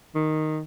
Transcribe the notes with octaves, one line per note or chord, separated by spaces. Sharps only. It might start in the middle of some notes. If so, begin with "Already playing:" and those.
D#3